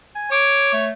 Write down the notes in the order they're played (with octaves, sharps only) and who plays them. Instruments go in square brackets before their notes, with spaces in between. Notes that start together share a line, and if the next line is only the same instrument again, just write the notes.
[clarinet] G#5
[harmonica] C#5 [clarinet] D6
[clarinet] A3